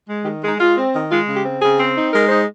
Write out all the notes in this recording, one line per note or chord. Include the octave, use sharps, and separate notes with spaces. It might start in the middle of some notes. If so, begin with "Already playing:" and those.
G#3
G4
D#3
G#3 D#4
G#3 F4
C4
D#3
G#3 F4
C#3
G4
C4
C#3 G#4
C4
D#4
G#3 A#4
D#4 C5